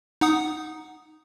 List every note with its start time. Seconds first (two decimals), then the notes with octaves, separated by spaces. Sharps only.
0.21 D#4 F#5 D#6